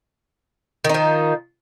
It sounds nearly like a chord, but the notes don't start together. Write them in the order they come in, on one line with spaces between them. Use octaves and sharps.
D#3 D#4 F3